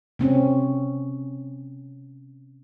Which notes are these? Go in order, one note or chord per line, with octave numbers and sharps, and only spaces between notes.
C3 C4 C#4